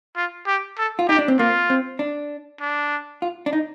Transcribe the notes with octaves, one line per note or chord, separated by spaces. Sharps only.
F4
G4
A4
F4
D#4 G4
D4
C4
A#3 F4
C4
D4
D4
F4
D4
D#4